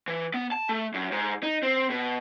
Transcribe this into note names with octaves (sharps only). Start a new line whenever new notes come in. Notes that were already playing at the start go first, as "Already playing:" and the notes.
E3
B3
A5
A3
F#2
G#2
D#4
C4
B2